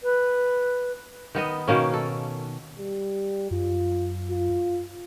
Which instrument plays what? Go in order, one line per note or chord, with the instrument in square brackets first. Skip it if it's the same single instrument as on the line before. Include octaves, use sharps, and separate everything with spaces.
[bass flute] B4
[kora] D#3 B3 D#5
B2 D#3 A#3 C#4
A4
[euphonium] G3
[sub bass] F#2 [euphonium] F4
[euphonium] F4